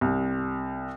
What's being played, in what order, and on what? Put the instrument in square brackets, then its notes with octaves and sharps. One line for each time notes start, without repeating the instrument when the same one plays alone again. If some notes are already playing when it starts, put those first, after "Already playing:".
[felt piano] C2